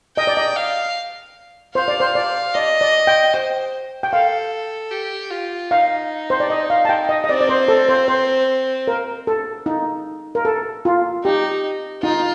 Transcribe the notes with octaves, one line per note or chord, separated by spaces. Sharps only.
D#5 G5
D5
D#5
F5
C5 F5
D5
C5
D5
D5 D#5
D5
G5
C5 G5
G5
A4 F5
G4
F4
D#4 F5
C5
D5
D#5
F5
A5
G5
D#5
D#5
C4 D5
D5
C5
A4
C5
C5
A#4
A4
D#4
A#4
A4
F4
D#4 G4
D#4 F4